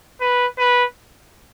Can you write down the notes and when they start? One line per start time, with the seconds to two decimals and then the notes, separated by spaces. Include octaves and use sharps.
0.21 B4
0.58 B4